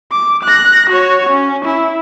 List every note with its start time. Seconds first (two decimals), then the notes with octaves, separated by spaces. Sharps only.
0.12 D6
0.43 F#6 A#6
0.90 F#4 C#5
1.30 C#4
1.65 E4